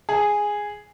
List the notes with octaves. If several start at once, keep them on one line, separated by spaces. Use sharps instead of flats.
G#4